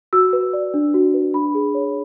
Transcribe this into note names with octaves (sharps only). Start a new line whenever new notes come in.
F#4 E6
B4
D5
D4
F#4
B4
D4 B5
G#4
C#5